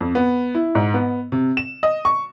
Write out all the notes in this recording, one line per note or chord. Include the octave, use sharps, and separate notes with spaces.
F2
B3
E4
G#2
B3
C3
E7
D#5
C#6